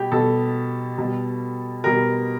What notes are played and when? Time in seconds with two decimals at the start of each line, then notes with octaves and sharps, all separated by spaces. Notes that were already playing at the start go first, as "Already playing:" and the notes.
Already playing: B2 G3 G4
0.12 B2 G3 A4
0.98 B2 G3
1.84 B2 G3 A#4